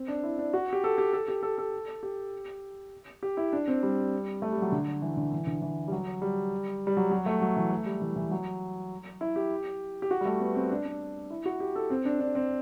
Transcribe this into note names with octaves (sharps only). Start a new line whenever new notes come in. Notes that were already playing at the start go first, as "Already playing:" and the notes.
Already playing: C4
D4
E4
D4
F#4
G4
A4
G4
A4
G4
A4
A4
G4
G4
E4
D4
C4
G3
A3
G3
F#3
D3
E3
D3
E3
D3
E3
G3
F#3
G3
G3
F#3
F#3
A3
F#3
E3
A3
G3
E3
E3
F#3
E4
G4
G4
F#4
G3
A3
B3
C4
D4
D4
E4
F#4
G4
A4
C4
D4
D4
C4